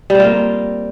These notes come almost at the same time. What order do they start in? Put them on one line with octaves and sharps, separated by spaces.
G3 C4 F4 A#3